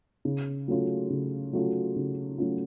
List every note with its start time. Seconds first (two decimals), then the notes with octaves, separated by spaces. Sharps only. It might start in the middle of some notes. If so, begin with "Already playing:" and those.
0.25 C#3
0.68 F#3 A3 C#4 F4
1.10 C#3
1.53 F#3 A3 C#4 F4
1.96 C#3
2.38 F#3 A3 C#4 F4